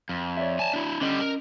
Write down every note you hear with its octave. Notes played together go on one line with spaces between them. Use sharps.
F2
C#5 D5 E5
G#5 A5
D4 E4
D3 G3 C#4 D#5
A#4